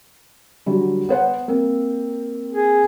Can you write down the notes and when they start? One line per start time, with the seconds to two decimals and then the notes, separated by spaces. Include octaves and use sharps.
0.66 D3 F#3 G3
1.09 B3 C5 F#5
1.48 A#3 C4 A#4
2.53 G#4